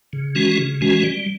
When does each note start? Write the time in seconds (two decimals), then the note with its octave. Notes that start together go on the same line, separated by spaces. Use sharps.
0.13 C#3
0.35 E3 G#3 C#4 F#4
0.58 C#3
0.81 E3 G#3 C#4 F#4
1.03 G3